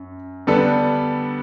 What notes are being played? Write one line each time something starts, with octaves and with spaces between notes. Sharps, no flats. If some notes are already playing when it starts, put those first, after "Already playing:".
Already playing: F#2
D3 G3 B3 D4 A4